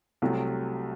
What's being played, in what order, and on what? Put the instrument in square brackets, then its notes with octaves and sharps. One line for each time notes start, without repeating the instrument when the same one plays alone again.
[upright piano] C2 C3 F#3 A3